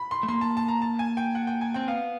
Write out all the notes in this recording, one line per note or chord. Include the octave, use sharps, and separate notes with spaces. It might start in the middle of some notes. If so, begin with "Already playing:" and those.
Already playing: B5
C6
A3
A#3 C6
A5
A5
A#5
A5
G#5
G5
F#5
G5
G#5
C4 G5
B3 F5